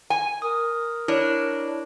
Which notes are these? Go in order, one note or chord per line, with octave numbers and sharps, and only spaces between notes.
G#5
A#4 D#6
D4 E4 C#5